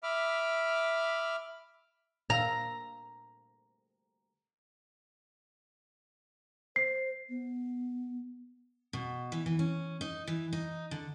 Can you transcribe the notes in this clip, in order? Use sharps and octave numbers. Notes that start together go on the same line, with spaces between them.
E5 B5 D6 F6
A#2 F5 A#5 E6
C5 C7
B3
B2
E3
E3
C#4
D#4
E3
D#4
D3